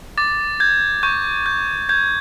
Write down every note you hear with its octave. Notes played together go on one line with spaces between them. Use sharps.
D6 A6
G6 G#6
C#6 G6
G6
G6 G#6